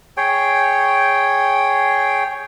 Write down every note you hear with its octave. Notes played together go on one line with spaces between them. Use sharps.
G#4 C#5 G5